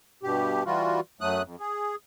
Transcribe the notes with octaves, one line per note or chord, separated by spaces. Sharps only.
G2 B2 G4
E3 G3 F4 F#4
F#2 F#3 A3 D#6 F#6
F2
G#4